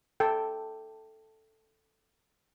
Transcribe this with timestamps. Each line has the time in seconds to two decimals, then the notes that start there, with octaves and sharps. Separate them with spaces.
0.20 A4 G5